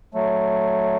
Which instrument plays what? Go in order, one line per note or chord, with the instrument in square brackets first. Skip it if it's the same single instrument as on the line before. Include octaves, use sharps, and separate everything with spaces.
[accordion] F#3 A3